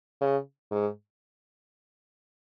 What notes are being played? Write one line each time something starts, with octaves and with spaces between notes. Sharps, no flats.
C#3
G#2